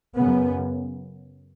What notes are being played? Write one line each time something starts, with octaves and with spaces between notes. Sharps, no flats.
F#2 C#3 B3